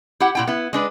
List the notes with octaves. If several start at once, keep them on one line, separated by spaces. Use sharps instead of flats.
E4 G4 F#5
A#2 E4 G5
B3 E4
G#3 D4 B4